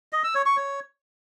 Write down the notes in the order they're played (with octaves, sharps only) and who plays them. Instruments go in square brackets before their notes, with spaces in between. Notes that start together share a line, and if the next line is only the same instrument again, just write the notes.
[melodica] D#5
E6
C#5
C#6
C#5